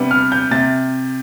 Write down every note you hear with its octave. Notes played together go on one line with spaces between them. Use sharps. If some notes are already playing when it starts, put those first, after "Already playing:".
Already playing: C3 G3 B3 D4
F6
G6
C3 A6